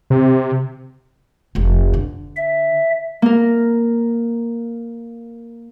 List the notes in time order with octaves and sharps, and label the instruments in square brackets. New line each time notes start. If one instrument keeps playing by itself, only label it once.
[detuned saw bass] C3
[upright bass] F1 F2
D3
[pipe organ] E5
[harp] A#3 A#4